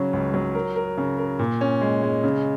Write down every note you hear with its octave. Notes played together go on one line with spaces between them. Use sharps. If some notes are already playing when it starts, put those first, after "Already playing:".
Already playing: C#3 F#3 C#4
C#2
F#3
A#4
A#4
C#3
A#4
A#2
C#4
G#3
G#3
C#3